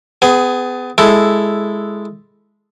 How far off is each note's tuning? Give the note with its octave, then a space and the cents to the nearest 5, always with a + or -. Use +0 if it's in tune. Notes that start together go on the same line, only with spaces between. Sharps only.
B3 +30 G#4 +0
G#3 +0 E4 +0 A4 -5